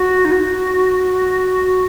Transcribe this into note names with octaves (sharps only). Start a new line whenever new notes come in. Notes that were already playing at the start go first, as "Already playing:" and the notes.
Already playing: F#4
D#4
F#4